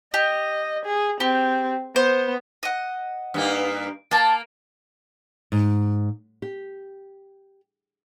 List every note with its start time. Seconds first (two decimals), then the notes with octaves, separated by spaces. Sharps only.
0.14 G4 D#5
0.85 G#4
1.20 C4 G4
1.96 B3 C5
2.63 D#5 F#5
3.34 G2 A#3 D#4
4.11 A#3 D4 A5
5.52 G#2
6.42 G4